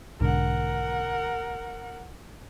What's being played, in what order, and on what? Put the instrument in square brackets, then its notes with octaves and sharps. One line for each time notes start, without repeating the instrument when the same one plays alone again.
[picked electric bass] B1 G#2 D3 [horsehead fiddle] A#4 F#5